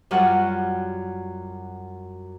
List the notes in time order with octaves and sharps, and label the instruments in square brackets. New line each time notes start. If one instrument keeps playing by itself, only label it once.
[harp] F#2 G3 F4 F#4 F#5